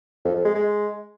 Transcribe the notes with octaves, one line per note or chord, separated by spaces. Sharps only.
F2
F2
G#3
G#3